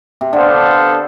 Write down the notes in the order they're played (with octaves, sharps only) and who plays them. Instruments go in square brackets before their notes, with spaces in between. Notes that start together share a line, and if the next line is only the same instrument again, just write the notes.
[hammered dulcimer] C3
[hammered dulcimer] D3 [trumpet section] B3 D4 A4 C5 F5